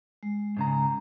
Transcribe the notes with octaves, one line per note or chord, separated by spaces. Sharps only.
G#3
G#2 C#3 A#5